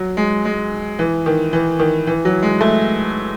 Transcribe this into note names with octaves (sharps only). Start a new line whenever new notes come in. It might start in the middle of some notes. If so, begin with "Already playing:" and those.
Already playing: F#3
G#3
G#3
E3
D#3
E3
D#3
E3
F#3
G#3
A3